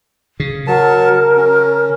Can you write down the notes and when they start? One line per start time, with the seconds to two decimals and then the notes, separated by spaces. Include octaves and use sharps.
0.40 C#3
0.67 F#3 A#4 A5
1.37 C#4